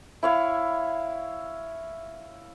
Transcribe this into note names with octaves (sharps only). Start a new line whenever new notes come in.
E4 C#5 F5